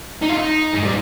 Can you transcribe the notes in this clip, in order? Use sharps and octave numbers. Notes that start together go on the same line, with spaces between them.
D#4
F4
D#4
G#3
G3